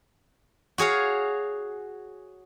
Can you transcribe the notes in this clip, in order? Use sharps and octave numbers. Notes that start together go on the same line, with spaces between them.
F#4 G#4 C#5 F5